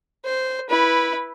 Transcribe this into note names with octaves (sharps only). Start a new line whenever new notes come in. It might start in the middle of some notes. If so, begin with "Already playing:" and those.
C5
E4 B4